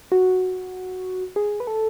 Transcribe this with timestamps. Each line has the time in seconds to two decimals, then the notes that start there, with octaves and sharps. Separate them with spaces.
0.12 F#4
1.36 G#4
1.60 B4
1.67 A4